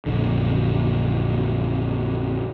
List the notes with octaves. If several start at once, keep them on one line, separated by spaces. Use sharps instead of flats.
A#1 F#2 D3